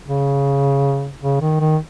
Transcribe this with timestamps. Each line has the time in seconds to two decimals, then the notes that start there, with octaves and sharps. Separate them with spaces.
0.08 C#3
1.22 C#3
1.41 D#3
1.60 D#3